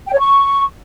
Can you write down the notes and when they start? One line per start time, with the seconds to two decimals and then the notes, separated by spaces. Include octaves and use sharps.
0.08 G5
0.13 C#5
0.19 C#6